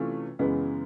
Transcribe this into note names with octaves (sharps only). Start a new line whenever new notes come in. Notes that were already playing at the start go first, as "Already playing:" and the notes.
Already playing: C3 E3 A3 C#4 F4
F#2 C#3 E3 G#3 B3